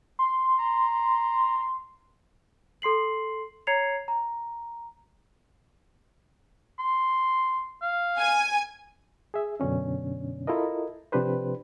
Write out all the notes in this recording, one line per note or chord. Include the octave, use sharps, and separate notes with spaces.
C6
A#5
A4 C6 C7 F#7
C#5 A#5 G#6 C7 C#7 F7
A#5
C6
F5
G#5
G#4 E5
F#2 B2 D3 C#4 D4
E4 F4 A4 A#4 D#5
C3 F3 D4 G4 B4 C5